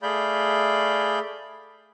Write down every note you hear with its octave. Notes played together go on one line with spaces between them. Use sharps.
A3 G#4 D5 F5 B5 G6